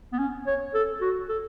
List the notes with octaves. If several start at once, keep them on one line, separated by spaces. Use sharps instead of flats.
B3
C#4
C#5
A4
F#4
A4